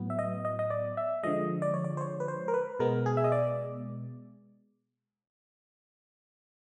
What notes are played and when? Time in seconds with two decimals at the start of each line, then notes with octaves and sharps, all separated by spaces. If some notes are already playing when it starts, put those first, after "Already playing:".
Already playing: A2 F#3 B3
0.10 E5
0.19 D#5
0.45 D#5
0.59 D#5
0.70 D5
0.97 E5
1.23 D3 F3 G#3 D#5
1.62 D5
1.74 C#5
1.84 D5
1.97 C5
2.01 C#5
2.20 B4
2.28 C5
2.48 A#4
2.54 B4
2.79 B2 G#3 B3 A#4
3.06 G#4
3.17 E5
3.24 D#5
3.32 D5